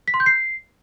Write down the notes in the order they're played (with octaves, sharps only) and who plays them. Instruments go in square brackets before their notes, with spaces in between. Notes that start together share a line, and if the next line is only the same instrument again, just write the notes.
[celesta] B6
C6
G6
C7